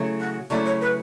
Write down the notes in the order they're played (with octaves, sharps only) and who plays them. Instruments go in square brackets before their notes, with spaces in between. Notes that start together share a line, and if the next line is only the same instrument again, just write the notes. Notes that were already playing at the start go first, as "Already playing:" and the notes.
Already playing: [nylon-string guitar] C#3 F#3 A3 E4
[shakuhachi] F#5
[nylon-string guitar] C#3 F#3 A3 E4 [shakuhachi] D5
[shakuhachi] C#5
B4